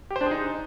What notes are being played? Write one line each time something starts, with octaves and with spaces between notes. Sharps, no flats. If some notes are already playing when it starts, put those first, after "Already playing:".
G4
C5
D4
G#4
D#4